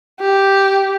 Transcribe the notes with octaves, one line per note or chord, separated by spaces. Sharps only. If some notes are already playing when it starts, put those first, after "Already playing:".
G4